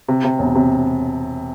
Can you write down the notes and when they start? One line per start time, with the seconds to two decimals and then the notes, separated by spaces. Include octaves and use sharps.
0.08 C3
0.24 C3
0.39 E1
0.55 C3